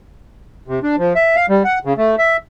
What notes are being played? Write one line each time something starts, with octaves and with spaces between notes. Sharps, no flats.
C3
D4
F3
E5
F5
G3
F#5
C#3
A3
E5